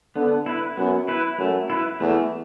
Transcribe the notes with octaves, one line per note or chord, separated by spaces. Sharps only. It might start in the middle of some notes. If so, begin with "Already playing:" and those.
D3 B3
E4 B4
F#2 B3
E4 B4
F#2 A3
E4 B4
E2 A3